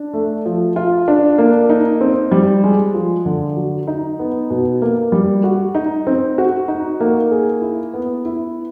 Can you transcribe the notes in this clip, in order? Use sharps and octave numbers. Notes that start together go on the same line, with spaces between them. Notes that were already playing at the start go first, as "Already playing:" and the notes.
Already playing: D4
A3
F3
F4
D4
A#3
D#4
C4
G3
G#3
F3
D3
F#3
D#4
B3
B2
A#3
G3
F#4
D#4
C4
F#4
D#4
A#3
G#4
E4
B3
E4